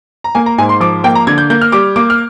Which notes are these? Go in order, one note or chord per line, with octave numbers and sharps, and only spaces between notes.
A#5
A#3 G#5
A#5
G#2 G#5
C6
F3 D6
A#3 G5
A#5
D3 G#6
G6
A#3 G6
F6
G3 D6
A#3 D6
F6